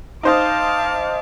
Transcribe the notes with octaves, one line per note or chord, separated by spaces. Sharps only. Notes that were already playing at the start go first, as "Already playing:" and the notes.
D#4 C5 D#5 F5 A5 D6